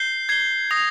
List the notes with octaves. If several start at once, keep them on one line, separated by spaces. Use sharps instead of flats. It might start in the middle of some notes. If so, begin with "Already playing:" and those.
Already playing: G6 C7 G7
G#6 C7 G7
D#6 A#6 F7